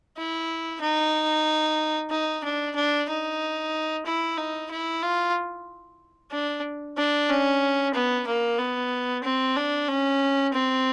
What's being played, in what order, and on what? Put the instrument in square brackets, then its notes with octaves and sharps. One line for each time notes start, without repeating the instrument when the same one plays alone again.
[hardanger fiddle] E4
D#4
D#4
D4
D4
D#4
E4
D#4
E4
F4
D4
D4
C#4
B3
A#3
B3
C4
D4
C#4
C4